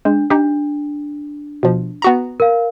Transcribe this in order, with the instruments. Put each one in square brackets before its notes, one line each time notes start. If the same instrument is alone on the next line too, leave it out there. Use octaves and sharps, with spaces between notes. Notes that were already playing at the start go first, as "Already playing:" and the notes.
[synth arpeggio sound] G#3 [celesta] D4
[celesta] D4 [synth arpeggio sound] D#4 G4
[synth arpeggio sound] B2 F3
B3 F#4 A#5
[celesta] A#4 F5